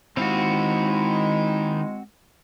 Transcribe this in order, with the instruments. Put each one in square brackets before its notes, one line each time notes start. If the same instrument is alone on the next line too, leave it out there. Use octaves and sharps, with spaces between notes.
[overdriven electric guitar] D#3 F5 [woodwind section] G#3 [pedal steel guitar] C4 F#4 [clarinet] E4